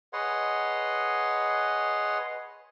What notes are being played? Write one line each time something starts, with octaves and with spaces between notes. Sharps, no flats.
G#4 B4 C#5 D#5 F#5 C6